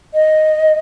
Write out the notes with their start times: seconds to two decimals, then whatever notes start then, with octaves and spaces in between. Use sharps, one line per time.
0.14 D#5